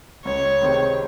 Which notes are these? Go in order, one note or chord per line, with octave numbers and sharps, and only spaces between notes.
C#2 C#5
C3 D#3 G#3 C4